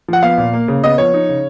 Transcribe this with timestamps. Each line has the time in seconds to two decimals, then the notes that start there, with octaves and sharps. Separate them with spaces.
0.08 F3 F#5
0.23 B3 F5
0.37 A#2
0.53 A#3
0.68 C#3
0.83 B3 D#5
0.98 F3 C#5
1.14 D#4
1.29 C#3